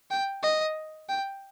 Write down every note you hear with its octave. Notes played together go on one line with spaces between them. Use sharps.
G5
D#5
G5